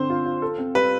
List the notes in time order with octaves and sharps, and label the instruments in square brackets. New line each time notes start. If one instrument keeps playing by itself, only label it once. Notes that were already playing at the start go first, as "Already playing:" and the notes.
Already playing: [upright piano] D3 C4 [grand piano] C5
[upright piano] F4
F4
A4
C4
[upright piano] G3 [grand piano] B4